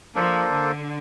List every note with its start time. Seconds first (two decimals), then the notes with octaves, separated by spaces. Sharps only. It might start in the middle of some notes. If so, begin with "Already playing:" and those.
0.14 F3 A#3 D4 A4 C5
0.50 D3